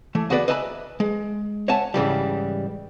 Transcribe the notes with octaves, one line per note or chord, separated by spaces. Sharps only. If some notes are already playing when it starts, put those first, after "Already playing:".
E3 A3
B3 F#4 G#4 B4 D5
B4 D#5 E5 G#5 A5 B5
G#3
C#5 E5 F#5 G#5 A5
G#2 C#3 E3 G3